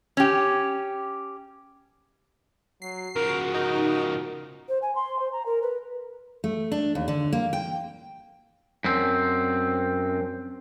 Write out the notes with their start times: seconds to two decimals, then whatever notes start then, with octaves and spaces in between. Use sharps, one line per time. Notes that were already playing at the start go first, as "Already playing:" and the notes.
0.17 C#4 G4
2.82 F#3 C7
3.16 C#3 F3 F#4 A#4
3.54 D#4 A#4
4.68 C5
4.82 G#5
4.95 C6
5.19 C5
5.32 A#5
5.45 A#4
5.62 B4
6.44 A3
6.72 D4
6.95 D#2
7.08 D3
7.33 A#3
7.53 G5
8.84 F#2 C4